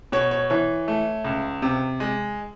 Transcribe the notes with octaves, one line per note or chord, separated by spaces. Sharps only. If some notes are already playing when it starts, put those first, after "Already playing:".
B2 C#5
C#5
E3 C#5
A3
C#2
C3
G#3